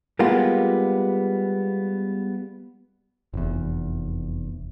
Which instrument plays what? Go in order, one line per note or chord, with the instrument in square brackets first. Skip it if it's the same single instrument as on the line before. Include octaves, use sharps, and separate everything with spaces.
[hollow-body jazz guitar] G3 G#3 A#3 B3 F4 G4
[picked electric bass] F1 E2